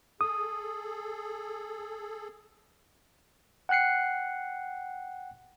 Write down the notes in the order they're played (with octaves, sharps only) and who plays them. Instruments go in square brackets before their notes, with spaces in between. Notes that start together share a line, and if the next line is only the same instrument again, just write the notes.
[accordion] G#4 A4 [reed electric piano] D#6
[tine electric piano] F#5 G5 F#6 C7 C#7